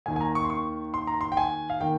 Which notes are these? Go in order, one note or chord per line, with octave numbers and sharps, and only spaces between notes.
D#2 D#3 A#3 G#5
G#5
A#5
C#6
C6
C#6
C6
A#5
C6
G5
G#5
F5
D#3 A#3 G5